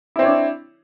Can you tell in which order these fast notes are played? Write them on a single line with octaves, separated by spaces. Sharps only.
E4 C4 C#5 D4